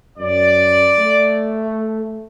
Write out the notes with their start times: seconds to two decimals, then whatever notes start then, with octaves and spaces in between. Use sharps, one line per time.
0.18 F#2 D5
0.97 A3